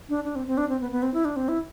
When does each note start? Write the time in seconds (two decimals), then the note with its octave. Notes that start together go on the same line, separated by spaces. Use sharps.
0.09 D4
0.24 D4
0.36 C4
0.47 C4
0.57 D4
0.69 C4
0.81 B3
0.92 B3
1.02 C4
1.14 E4
1.25 D4
1.36 C4
1.48 E4